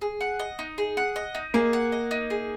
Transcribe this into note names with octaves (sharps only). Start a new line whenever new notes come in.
G#4
F#5
D#5
D#4
G#4
F#5
D#5
D#4
A#3 G#4
F#5
D#5
D#4
G#4